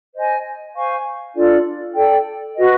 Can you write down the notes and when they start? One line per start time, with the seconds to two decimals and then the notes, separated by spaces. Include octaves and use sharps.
0.15 C5 D#5 G#5
0.75 C5 F5 G#5 C#6
1.35 D4 F4 A4 D5
1.95 A4 D5 G5
2.55 F#4 B4 D#5